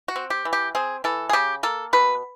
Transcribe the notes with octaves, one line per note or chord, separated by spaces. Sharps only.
F#4
C4
G4
E3
G4
C4 G#4
E3 A4
G#4
C#3 G4
A#3 A4
B2 B4